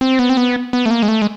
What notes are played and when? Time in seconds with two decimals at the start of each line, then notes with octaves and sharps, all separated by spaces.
0.01 C4
0.19 B3
0.30 C4
0.37 B3
0.73 B3
0.86 A3
0.91 A#3
1.03 G#3
1.08 A3
1.22 G#3